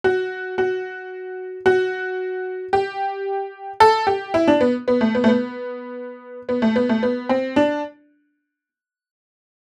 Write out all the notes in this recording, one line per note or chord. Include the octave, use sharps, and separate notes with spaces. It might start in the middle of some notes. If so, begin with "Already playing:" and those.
F#4
F#4
F#4
G4
A4
G4
E4
D4
B3
B3
A3
B3
A3
B3
B3
A3
B3
A3
B3
C4
D4